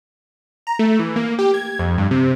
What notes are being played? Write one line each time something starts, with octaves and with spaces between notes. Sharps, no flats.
A#5
A3
E3
A#3
G4
G#6
F2
G2
C3